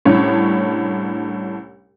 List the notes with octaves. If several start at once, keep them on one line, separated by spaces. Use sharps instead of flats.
C2 A2 C#4 D4 C#5